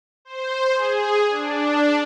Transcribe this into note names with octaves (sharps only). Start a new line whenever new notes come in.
C5
G#4
D4